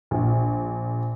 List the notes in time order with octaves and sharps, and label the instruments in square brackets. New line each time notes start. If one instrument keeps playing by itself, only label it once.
[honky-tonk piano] A#1